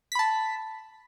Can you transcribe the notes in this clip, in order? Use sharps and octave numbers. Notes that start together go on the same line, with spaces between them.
A5 B5 B6